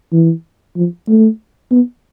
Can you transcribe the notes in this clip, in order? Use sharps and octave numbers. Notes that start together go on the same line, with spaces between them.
E3
F3
A3
B3